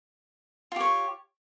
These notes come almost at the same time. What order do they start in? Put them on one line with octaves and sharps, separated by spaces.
F4 G4 C#5